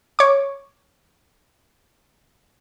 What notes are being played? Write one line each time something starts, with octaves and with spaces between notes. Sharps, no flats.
C#5 D6